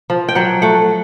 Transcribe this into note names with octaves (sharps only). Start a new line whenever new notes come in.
F3
G5
F#3 F#5
A3 F#5